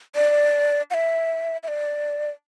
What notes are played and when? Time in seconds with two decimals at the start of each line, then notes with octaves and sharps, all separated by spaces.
0.16 D5
0.91 F#5
0.94 E5
1.63 E5
1.68 D5